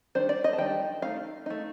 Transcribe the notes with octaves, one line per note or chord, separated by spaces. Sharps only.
D#3 G3 D4 C5
D5
D#5
A5
D#3 G3 D4 G5
A3 D#4 F5
A3 D#4